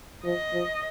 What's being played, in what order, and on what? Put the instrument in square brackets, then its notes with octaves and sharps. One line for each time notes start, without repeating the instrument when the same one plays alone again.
[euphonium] F3 [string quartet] D#5
[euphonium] F3